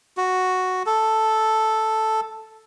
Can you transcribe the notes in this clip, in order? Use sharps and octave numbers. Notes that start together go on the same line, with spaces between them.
F#4
A4